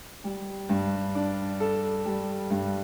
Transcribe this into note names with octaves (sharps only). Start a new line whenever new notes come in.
G3
G2
D4
A4
G3
G2